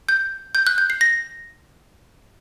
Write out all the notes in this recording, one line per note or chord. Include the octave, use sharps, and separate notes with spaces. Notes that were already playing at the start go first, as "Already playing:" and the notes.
G6
G6
F#6
G6
C7
A#6